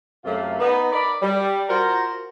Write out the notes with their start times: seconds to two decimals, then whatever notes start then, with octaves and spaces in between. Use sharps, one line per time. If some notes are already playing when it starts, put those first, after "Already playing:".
0.25 F#2 C3 A3 A#3 F4
0.60 B3 D#4
0.92 A#4 D5 B5
1.22 G3
1.69 F4 F#4 A#4 C5 F#5 A#5